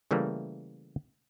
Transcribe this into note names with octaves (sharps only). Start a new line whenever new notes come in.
C#3 E3 G3 A3 A#3